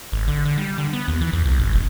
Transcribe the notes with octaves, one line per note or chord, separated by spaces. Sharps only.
G#1
D3
D3
G3
D3
B3
D#2
E3
E2
C2
G#1
E1